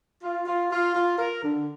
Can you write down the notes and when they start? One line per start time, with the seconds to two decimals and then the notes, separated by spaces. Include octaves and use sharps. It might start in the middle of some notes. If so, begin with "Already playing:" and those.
0.22 F4
0.46 F4
0.71 F4
0.95 F4
1.18 A#4
1.43 D3